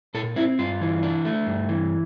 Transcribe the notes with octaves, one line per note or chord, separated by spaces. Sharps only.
A#2 A4
C4 E4
G2 F4
E3
D4
A3
G2
E3